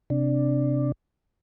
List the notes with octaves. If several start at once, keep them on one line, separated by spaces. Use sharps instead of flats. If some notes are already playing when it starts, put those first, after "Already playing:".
C3 D4